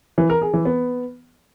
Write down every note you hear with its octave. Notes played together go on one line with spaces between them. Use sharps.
E3
A#4
G#4
E3
B3